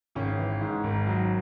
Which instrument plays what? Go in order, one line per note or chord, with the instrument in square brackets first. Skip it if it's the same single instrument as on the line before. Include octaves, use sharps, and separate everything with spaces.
[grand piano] G#1 C#3 C#4
E3
G#2
G#1
F#3